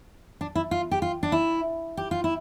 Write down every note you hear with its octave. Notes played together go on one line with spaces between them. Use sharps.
D4
E4
F4
G4
F4
D4
E4
G4
F4
E4